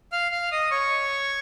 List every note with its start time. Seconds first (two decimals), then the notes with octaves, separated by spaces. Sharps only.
0.12 F5 F6
0.32 F5 F6
0.52 D#5 D#6
0.71 C#5 C#6